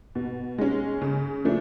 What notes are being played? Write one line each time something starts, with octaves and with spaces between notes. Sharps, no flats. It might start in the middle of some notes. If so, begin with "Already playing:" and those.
B2
G#3 C#4
C#3
F3 A3 D4